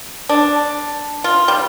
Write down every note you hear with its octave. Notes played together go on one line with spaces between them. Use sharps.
D4
F4
G3